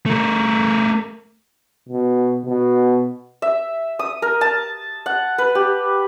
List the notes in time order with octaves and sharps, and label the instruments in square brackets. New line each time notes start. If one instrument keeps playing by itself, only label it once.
[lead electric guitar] A3 A#4
[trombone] B2
B2
[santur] E5
D#6
A#4
A5
F#5
B4
G4